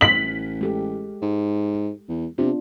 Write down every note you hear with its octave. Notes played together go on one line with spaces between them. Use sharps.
A1 B6 F#7
G#3 G4 A4
G#2
E2
C3 B3 D4 F4